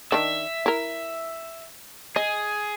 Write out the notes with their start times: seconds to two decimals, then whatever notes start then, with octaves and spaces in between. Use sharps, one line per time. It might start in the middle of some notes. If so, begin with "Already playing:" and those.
0.12 D#3 D4 E5
0.66 E4 A#4
2.16 G#4 D#5